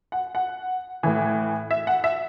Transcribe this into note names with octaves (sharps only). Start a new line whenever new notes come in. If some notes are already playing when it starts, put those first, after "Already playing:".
F#5
F#5
A2 E3
E5
F#5
E5